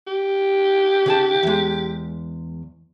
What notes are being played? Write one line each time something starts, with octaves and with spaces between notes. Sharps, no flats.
G4
C#3 G#4 A5
E2 G#3